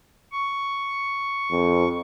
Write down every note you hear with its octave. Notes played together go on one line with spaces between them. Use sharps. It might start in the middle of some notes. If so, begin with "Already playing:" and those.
C#6
F2